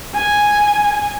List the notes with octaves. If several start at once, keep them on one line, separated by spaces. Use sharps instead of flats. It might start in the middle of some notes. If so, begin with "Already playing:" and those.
G#5